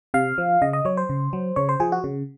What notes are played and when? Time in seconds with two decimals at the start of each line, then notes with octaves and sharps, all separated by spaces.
0.14 C3 F5
0.38 F3
0.62 C#3 D#5
0.73 D#5
0.85 F#3 C#5
0.97 C5
1.09 C#3
1.33 F#3
1.56 C#3 C#5
1.69 C5
1.80 F3 G#4
1.92 F#4
2.04 C#3